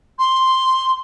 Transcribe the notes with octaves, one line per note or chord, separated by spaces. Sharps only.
C6